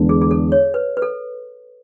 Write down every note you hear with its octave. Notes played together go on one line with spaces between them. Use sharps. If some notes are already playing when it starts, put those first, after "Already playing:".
Already playing: E2 D3 G#3 B3 D4
G#4
G#4
A4
C#5
B4
B4
A4